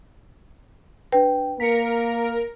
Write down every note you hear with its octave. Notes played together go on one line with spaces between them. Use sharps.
D4 B4 G5
A#3 A#4 B6 C#7